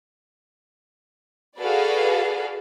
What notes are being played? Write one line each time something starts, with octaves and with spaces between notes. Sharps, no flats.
F#4 G#4 A4 B4 D5 F5